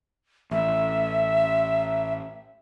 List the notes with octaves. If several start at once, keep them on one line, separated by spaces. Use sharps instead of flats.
A1 E5